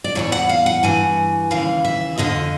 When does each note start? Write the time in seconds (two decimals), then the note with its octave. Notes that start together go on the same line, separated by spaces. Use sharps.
0.04 D5
0.15 E2 C3 E3 C#5
0.32 F#5
0.49 F5
0.66 F#5
0.83 G2 E3 G#5
1.51 D#2 C#3 E3 F5
1.85 E5
2.18 F2 D3 F3 D#5